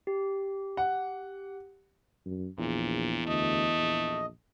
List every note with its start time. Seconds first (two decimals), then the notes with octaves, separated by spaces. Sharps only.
0.07 G4
0.77 F#5
2.26 F#2
2.58 A#1 E2 A#2
3.27 D2 A3 D#5
3.79 A#1